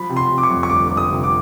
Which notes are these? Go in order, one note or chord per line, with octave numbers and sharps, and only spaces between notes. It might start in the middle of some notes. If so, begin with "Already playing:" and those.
Already playing: F3 B5
C3
C6
C3
D6
C#6
F2
C#6
G1 D6
G1 D6
D#6
C3
D6